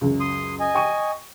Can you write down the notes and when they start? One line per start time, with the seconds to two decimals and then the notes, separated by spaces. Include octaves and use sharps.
0.01 C#2 F#2
0.20 C6 D#6
0.60 D#5 G#5
0.74 G5 C#6 D#7